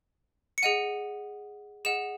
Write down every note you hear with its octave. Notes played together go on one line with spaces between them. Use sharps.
C#7
G#4 D#5 F#5 D#7
G#4 D#5 F#5 E7